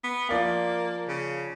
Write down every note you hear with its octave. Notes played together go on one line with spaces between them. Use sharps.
B3
F3 A#3 D5 F5
C#3